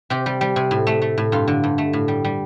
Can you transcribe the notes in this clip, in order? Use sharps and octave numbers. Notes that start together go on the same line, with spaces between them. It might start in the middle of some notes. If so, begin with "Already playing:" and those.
C3 G4
G3
G3
C3
A2
A3
A3
A2
G2 F4
D3
G2
A3
A2
G3
G3